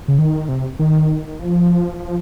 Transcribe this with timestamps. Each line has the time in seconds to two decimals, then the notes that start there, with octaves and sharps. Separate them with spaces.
0.08 C#3
0.18 D#3
0.49 C3
0.79 D#3
1.39 F3
2.00 F3